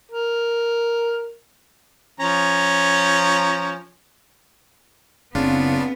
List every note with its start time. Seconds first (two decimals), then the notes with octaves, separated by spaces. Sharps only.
0.11 A#4
2.20 F3 C#4 A#5
5.35 F#1 C#3 B3 C4 D4 F4